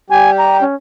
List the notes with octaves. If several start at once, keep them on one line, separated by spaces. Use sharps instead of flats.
G3 G4 G#5
A#5
C#4